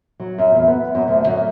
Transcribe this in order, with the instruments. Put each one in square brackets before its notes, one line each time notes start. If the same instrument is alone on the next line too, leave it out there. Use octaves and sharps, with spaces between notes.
[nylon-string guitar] F#3
F#2
E2
B3
F#2
D2
F#2